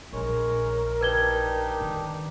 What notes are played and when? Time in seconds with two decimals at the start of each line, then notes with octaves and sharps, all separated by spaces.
0.13 A#1 G#3 A#4 C#5
1.01 D4 D#4 G4 B4 G#6 G7
1.80 D3 D#3